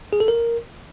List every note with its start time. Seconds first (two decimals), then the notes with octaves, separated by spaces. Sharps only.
0.13 G#4
0.20 A4
0.28 A#4